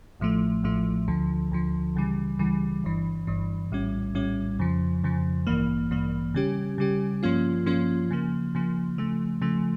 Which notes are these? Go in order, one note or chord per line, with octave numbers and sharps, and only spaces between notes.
A1 A2 F3 A3
A1 A2 F3 A3
D2 D3 F3
D2 D3 F3
C#2 C#3 E3 G3
C#2 C#3 E3 G3
G1 G2 E3
G1 G2 E3
A#1 A2 G3 C#4
A#1 A2 G3 C#4
F2 C#3 F3
F2 C#3 F3
A1 G2 E3 A#3
A1 G2 E3 A#3
C#3 G3 C#4 G4
C#3 G3 C#4 G4
G2 F3 A#3 C#4 F4
G2 F3 A#3 C#4 F4
C#3 F3 A#3
C#3 F3 A#3
C#3 F3 A3
C#3 F3 A3